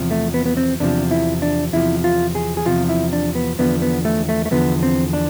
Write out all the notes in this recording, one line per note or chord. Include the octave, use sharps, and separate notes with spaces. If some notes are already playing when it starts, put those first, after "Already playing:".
Already playing: E2 C3 F3
A3
B3
B3
C4
E2 C3 F3 D4
E4
D4
E2 C3 F3 E4
F4
G#4
G#4
E2 C3 F3 F4
E4
D4
B3
E2 D3 F3 B3
B3
A3
A3
A3
E2 D3 F3 B3
C4
D4